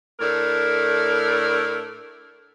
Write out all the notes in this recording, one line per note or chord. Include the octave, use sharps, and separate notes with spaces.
A2 A3 D4 A#4